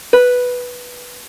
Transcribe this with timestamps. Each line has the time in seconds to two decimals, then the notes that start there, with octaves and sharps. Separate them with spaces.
0.13 B4